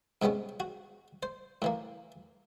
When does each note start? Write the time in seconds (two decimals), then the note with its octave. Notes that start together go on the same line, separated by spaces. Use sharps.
0.22 G#2 C3 G#3 B3 C#4
0.60 F#4
1.23 C5
1.62 A2 E3 A#3